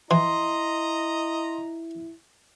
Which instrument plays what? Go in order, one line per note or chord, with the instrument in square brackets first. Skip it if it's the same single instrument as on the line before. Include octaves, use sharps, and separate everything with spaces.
[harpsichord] E3 [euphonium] E4 [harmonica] D#5 A#5 [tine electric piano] C6